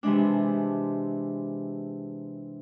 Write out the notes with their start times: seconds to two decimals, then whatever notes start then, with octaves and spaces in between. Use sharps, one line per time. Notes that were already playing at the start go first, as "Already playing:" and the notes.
0.03 C3 E3 G#3 D4